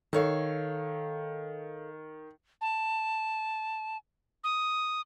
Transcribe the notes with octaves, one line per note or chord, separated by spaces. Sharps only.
D#3 A4 C#5 F5
A5
D#6